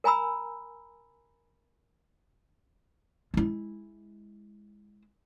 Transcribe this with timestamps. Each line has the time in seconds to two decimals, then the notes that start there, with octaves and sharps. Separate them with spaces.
0.04 A#4 G#5 A#5 B5 E6
3.34 G#3 E4